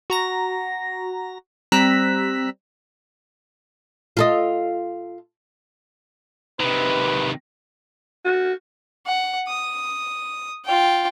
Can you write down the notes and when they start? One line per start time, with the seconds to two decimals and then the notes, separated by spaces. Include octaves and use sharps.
0.10 F#4 A#5 A#6
1.72 G3 C4 A#5 E6 F#6 B6
4.17 F4 A4 D#5
6.60 C3 D#3 B4
8.25 F#4
9.06 F#5
9.48 D#6
10.65 F4 G5